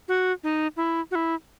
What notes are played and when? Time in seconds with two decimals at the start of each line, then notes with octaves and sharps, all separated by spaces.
0.08 F#4
0.43 D#4
0.77 E4
1.11 F#4
1.15 E4